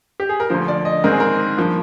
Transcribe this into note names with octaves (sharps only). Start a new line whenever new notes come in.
G4
G#4
A#4
D2 D3 F3 C5
D5
D#5
G#2 D#3 G#3 C4 A#4
G#4
A#4
G2 F3 A#3